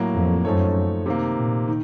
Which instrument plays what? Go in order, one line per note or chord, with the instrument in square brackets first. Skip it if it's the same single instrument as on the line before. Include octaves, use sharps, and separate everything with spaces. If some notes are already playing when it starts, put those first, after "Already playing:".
Already playing: [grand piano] A2 F#3 A#3
[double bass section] F2
[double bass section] F#2 [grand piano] F3 A3 D#4 A4 C#5
[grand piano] C3 D#3 A#3
[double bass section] A#2
[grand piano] D#3